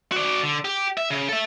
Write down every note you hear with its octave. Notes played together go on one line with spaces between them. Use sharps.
F#4 D5
D3
G4
E5
C#3
A4 E5